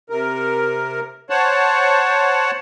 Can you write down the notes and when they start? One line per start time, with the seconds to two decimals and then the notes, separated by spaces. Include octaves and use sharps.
0.10 C3 A#4
1.30 C5 C#5 F#5 A5